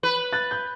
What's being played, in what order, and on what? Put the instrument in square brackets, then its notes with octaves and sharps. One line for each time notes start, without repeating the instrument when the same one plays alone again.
[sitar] B4
[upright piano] F#6 A6
G6